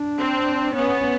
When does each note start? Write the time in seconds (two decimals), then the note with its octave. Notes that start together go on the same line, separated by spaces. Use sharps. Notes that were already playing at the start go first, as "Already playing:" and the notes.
Already playing: D4
0.18 C4
0.75 B3 C#4